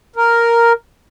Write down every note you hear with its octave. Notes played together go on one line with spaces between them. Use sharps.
A#4